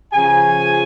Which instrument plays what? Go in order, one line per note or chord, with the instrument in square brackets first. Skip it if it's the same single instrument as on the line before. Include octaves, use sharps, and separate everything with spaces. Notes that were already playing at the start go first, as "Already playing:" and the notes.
[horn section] C#3 F3 G#5